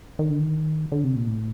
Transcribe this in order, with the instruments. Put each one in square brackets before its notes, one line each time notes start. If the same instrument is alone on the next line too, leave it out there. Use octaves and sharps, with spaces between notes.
[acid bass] D#3
D3
D#3
D3
C3
A#2
A2